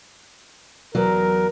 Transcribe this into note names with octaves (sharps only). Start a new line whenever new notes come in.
E2 F#3 A#4